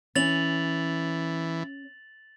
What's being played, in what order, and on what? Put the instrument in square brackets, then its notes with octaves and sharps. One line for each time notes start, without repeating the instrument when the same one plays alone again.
[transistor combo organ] E3 [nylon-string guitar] C#4 [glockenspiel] A6 F7 F#7